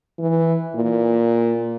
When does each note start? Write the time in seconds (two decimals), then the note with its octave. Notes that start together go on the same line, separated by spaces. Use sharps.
0.19 E3
0.75 A#2